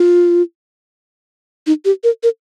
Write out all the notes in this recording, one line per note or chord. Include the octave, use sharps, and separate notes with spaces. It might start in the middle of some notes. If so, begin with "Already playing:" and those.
Already playing: F4
D#4
G4
A#4
A#4